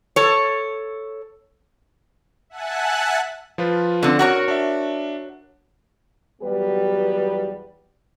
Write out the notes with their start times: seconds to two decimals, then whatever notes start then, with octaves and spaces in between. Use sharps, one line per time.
0.16 A4 C#5
2.50 E5 F#5 G#5 A5 F#6
3.58 F3 F4 B4
4.03 D3 C4
4.19 F#4 A#4 C#5 F#5
4.48 D4 E5
6.41 E2 F#3 G3 B3 G4 B4